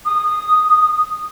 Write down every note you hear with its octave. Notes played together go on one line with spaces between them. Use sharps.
D#6